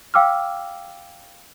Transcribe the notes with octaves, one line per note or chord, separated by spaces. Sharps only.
F5 G5 D6 E6 F6